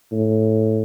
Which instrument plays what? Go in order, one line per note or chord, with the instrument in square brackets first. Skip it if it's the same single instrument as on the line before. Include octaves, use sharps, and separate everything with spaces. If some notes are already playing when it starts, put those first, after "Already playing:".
[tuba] A2